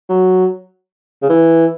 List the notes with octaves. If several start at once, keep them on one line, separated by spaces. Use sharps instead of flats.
F#3
C#3
E3